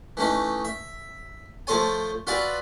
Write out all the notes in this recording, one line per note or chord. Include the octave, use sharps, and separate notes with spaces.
E3 A3 C#4 D#4
E5
F3 A3 A4 C5 C#5 G#5
F4 F#4 B4 D5 E5 G#5